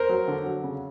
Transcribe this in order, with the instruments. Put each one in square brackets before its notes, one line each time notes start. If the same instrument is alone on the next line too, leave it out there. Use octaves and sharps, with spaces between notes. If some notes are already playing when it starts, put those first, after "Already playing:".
Already playing: [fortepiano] A#4 C5
F#3
D3
F#3
C#3